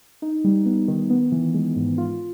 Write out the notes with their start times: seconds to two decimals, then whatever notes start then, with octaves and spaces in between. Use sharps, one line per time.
0.22 D#4
0.44 G3
0.66 B3
0.88 D#3
1.10 B3
1.32 E3
1.54 G#3
1.76 G#2
1.98 F4